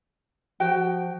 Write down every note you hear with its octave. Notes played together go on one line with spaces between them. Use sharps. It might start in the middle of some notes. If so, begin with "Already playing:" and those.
F3 F#4 G5